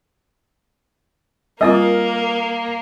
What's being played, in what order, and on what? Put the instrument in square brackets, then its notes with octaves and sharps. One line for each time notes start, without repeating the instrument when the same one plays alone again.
[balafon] G3 C4 F4 [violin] A#3 [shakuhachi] A#4 [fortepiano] D#5